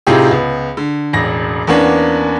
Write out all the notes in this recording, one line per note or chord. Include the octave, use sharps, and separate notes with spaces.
A2 C3 D#4 F4 G4 G#4
C#2 B3
D3
E1 A1 A#6
E2 A#3 B3 C#4 D4